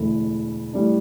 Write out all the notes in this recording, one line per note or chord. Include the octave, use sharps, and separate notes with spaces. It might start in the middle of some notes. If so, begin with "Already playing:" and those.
Already playing: E1 D2 D3 A3 E4
A2 G3 D4